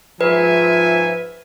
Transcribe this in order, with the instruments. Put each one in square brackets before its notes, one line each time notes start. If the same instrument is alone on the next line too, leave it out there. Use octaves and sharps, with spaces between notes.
[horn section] G#2 E5 G#5 [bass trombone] F3 [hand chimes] B4